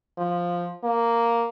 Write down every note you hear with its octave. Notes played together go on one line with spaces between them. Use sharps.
F3
A#3